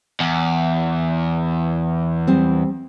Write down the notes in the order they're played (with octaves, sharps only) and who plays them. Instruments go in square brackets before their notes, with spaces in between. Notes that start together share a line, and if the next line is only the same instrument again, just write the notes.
[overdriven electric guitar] E2
[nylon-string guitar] G3 C4